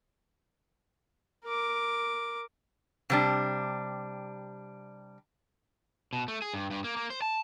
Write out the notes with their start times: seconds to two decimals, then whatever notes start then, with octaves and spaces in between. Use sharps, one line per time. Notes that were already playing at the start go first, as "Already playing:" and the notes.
1.45 A#4 D6
3.10 C3 G3 D4
6.13 B2
6.28 A3
6.42 G#4
6.54 G2
6.71 G2
6.84 A#3
6.97 A#3
7.10 C5
7.22 A5